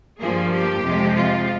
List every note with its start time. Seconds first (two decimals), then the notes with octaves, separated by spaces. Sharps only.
0.19 G2 F3 A#3 G#4
0.52 G4
0.83 F2 C3 F3 G#3
1.15 F4